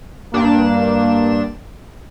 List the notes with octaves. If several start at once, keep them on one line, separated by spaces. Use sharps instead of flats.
G2 A#3 D4 E7